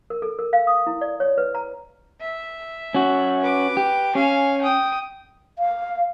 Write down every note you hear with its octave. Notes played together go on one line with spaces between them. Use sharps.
A#4
A4
A#4
F5
D#6
E4
D5
C#5
B4
A#5
E5
C#4 F#4
B4 D6
G4
C#4 F5 G#5
G5 D#6
F5